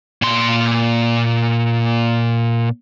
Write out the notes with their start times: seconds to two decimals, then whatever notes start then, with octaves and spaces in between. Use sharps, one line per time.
0.22 A#2 C6